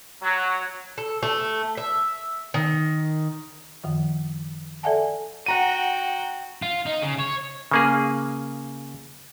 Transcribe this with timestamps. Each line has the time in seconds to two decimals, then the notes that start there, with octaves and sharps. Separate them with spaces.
0.22 F#3
0.98 A4
1.23 A3
1.77 E5
2.54 D#3
3.84 F#2 D#3 F3
4.83 A4 D5 E5 F#5 G#5 A5
5.46 F#4 F#5 G5 A#5 D#7
6.62 F4
6.86 D#4
7.02 C#3
7.19 C#5
7.71 C#3 A#3 G#4